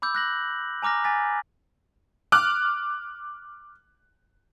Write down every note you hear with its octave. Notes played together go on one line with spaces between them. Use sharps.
B5 D6 E6 G6
F#6 A#6 F#7
G#5 A#5 D6 F6 A#6
G#5 A6 B6
D6 F6 F#6